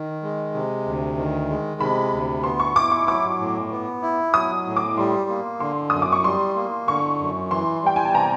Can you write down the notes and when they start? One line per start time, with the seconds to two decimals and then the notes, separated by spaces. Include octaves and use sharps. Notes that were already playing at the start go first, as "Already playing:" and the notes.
Already playing: D#3
0.23 G#3
0.54 C3
0.86 D2
1.18 D#3
1.49 G#3
1.80 C3 B5
2.12 D2
2.44 B3 C6
2.60 C#6
2.76 E4 D6
2.91 C#6
3.08 F#3 D6
3.39 A2
3.71 B3
4.02 E4
4.34 F#3 D#6
4.66 A2
4.76 D6
4.98 G3 C6
5.29 A#3
5.60 D3 C6
5.90 F#2 D#6
6.02 D6
6.12 C#6
6.24 G3 C6
6.56 A#3
6.88 D3 C#6
7.20 F#2
7.51 E3 C6
7.82 G3 G5
7.96 G#5
8.05 A5
8.14 C3 A#5